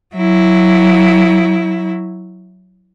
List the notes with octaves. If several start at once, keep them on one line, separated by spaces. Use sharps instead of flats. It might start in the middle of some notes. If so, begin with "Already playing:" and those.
F#3 E4